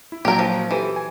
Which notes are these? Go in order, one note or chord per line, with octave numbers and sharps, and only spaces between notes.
E4
A#2 F#3 G4 A#4
F3
E3 G4 A4 C5
G#5